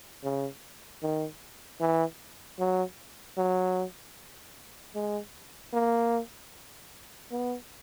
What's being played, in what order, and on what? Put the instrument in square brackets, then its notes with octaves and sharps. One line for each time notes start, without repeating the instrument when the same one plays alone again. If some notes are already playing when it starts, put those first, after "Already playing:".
[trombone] C#3
D#3
E3
F#3
F#3
G#3
A#3
B3